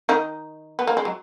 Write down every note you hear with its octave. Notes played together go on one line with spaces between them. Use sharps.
D#3 D#4
B3
A#3
G#3
F#3